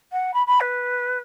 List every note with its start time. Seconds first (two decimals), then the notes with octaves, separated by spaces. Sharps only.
0.12 F#5
0.33 B5
0.46 B5
0.60 B4